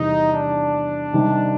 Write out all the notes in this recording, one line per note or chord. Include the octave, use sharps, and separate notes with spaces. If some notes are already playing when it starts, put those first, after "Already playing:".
Already playing: E2 C3 D#3 G3 D#4
D4
C3 D#3 G3